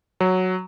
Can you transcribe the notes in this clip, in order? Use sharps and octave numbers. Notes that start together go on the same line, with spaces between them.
F#3